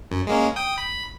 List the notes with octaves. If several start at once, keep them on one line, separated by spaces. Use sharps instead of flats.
F#2
G#3 A#3 C#4
G5 D#6
B5